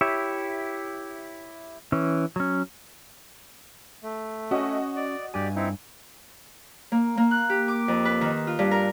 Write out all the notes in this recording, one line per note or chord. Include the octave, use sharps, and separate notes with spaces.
E4 G4 C#5 E5
E3 C#4
F#3 C#4
A3
C#4 F#4 C#5 D#5 G#5
D5
G2 G4 D5 G#5
C4 D#4 E4
A#3
A#3
F#6
G4
D6
F2
B4
D#3
F4
G2
A#4